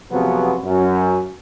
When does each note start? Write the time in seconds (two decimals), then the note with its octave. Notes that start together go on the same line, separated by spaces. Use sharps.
0.12 F2 C3 F3 F#3 G#3 B3
0.64 F#2